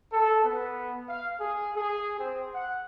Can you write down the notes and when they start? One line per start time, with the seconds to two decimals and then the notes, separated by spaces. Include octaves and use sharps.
0.12 A4
0.44 B3
1.09 F5
1.40 G#4
1.76 G#4
2.19 C4
2.55 F#5